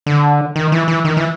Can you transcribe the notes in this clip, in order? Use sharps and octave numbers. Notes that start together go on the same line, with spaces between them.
D3
D#3
E3
E3
D#3
E3